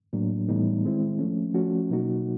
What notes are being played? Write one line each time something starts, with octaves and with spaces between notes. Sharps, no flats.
A2 F#3 A#3 D4
A2 E3 G3 B3 D#4
D#3 G#3 C4 E4
F3 A3 C#4
F3 A3 C#4 F#4
B2 F#3 A#3 D#4 F#4